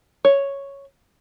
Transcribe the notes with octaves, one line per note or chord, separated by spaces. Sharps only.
C#5